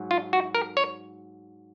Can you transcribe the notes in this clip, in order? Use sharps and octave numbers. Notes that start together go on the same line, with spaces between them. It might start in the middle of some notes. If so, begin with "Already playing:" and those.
Already playing: G#2 F#3
F4
F#4
A#4
C#5